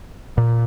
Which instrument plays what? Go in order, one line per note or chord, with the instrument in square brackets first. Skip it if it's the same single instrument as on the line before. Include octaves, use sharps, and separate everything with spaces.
[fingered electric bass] A#2